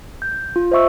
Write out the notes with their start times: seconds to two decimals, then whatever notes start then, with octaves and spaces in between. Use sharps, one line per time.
0.22 G6
0.56 F4
0.72 C5 D#5 E5 C#6 E6